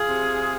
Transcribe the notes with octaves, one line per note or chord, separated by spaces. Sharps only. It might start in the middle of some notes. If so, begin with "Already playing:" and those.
Already playing: F4 G#4
C3